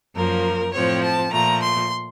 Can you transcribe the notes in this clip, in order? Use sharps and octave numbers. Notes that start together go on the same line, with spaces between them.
F#2 F3 A#3 A#4
A2 F3 C4 C#5
A5
A#2 F3 A3 A#5
C6